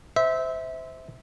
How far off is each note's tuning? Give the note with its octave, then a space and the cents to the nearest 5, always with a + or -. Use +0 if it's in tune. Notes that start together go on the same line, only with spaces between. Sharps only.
C5 -20 E5 -20